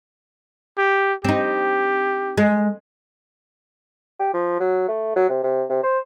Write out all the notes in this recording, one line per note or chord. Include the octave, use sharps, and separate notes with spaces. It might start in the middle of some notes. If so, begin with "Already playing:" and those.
G4
C4 D#4 G4
G#3
G4
F3
F#3
A3
F#3
C3
C3
C3
C5